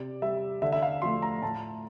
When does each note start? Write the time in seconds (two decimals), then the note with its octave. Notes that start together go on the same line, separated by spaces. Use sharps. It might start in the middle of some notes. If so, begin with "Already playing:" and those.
Already playing: C3 D5
0.22 G3 E5
0.62 D3 E5
0.72 E5
0.82 F5
1.02 F3 A3 C6
1.22 A#5
1.42 A2 A5